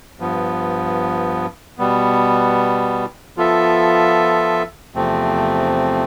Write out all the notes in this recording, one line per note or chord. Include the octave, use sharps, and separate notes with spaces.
G2 F3 B3
B2 G3 B3
F3 B3 F4 A4 E5
E2 C3 F3 A3 C4